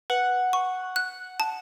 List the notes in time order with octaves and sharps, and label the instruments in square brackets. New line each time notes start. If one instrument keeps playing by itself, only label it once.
[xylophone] B4 [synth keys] F#5
[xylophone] C#6
F#6
A5